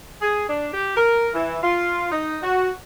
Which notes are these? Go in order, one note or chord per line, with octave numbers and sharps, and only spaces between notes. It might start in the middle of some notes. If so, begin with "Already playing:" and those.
G#4
D4
G4
A#4
E3
F4
D#4
F#4